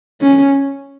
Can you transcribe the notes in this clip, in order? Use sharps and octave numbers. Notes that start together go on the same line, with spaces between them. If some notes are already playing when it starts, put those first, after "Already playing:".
C#4